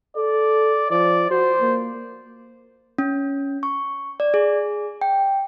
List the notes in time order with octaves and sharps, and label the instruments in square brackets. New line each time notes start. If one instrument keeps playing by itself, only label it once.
[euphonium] A4 [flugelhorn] D5
[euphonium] F3 [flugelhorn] D5
[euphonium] F#4 [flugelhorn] C5
[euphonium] A#3
[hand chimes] C#4
C#6
D5
G#4
G5